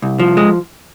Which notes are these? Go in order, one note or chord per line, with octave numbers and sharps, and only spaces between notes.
C2
F3
G#3